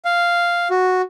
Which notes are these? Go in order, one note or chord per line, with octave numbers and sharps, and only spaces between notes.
F5
F#4